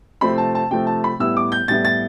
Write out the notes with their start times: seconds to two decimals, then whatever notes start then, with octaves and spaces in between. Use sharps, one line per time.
0.21 C3 F3 A3 C4 B5
0.38 A5
0.55 A5
0.70 C3 F3 A3 C4 G5
0.87 A5
1.04 B5
1.19 A2 G3 B3 E4 E6
1.37 D6
1.52 G6
1.68 A2 G3 B3 E4 A6
1.85 A6